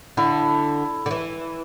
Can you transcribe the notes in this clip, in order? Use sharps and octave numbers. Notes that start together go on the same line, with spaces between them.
D3 E4
D3
E3